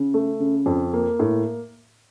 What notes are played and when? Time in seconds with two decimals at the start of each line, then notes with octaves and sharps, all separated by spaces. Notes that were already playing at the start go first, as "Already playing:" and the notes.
Already playing: C#3
0.14 A3
0.40 C#3
0.66 F2
0.93 A#3
1.19 A2